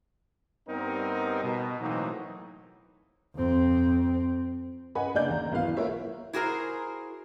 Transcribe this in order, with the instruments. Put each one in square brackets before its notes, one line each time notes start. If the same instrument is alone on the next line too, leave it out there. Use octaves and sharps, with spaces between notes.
[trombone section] G2 G3 B3 C4 D#4 A#4
B2
A2 E3 F#3 A#3 C4 D#4
[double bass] F2 C4
[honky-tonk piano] C#4 B4 D#5 F#5 G#5 B5
F#1 A#3 D4 D5 G6
D#2 A#5
B1 E3 B4 F5
A#3 F4 A#4 B4 C#5 E5
[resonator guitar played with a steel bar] E4 F#4 G#4 A#4 C5